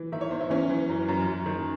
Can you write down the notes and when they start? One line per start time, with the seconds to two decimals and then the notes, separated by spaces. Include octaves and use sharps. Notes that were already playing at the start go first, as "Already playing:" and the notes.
Already playing: E3
0.12 D#3 E5
0.21 C#5
0.31 E2 C5
0.41 E4
0.50 E3 C#4
0.70 E3
0.89 F#2
1.08 F#2
1.27 F#2
1.46 D#3